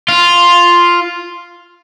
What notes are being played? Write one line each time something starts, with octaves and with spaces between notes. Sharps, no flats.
F4